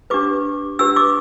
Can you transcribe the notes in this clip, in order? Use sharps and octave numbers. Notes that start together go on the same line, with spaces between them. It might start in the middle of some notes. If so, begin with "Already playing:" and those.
D4 G4 B4 D6
D4 G4 B4 E6
D6